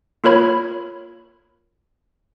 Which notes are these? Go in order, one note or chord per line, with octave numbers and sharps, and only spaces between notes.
A#3 F4 A#4 C#5 B5 G#6